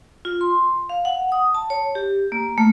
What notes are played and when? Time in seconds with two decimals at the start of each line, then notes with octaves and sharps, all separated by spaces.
0.25 F4
0.41 C6
0.89 F5
1.05 F#5
1.32 D#6
1.55 A5
1.70 C#5
1.95 G4
2.32 A#3
2.58 A3